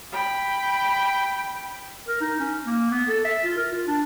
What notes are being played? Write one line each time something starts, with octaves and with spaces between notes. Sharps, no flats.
G5 B5
A#4
D#4
C#4
A#3
B3
A4
E5
F4
A#4
F4
D4